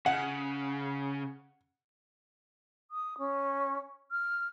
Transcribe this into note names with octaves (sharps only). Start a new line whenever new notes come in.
C#3 F#5
D#6
C#4
F6